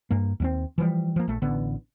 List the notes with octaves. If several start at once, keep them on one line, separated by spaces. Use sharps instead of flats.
G2 A#3
D#2 G3 C4
E3 F3 G3
F3 A#3
A#1 A3
A1 D3 B3